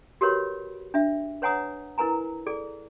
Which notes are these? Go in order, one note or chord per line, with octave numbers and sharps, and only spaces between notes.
F#4 G4 A#4 B4 C#5 B5
D4 E5
B4 C#5 F#5 G#5 A#5 D#6
E4 A#4 B4 G#5 A#5
G#4 A4 D5